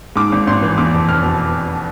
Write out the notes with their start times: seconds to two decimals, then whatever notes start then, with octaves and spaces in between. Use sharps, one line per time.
0.16 G#2 D6
0.32 G#1
0.47 G#1 C6
0.62 E3
0.78 E2 D6
0.94 F1
1.08 F1 F6
1.23 B2